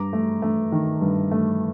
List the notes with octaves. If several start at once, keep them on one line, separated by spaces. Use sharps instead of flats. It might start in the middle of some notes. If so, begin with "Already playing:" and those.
Already playing: G2 A#5 D6
A3
A3
D#3
G2
A3